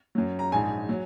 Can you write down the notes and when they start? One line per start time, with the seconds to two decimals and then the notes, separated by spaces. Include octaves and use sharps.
0.15 F#2 F#3
0.39 A#5
0.52 A#1 G#2 G#3 G#5
0.89 F#3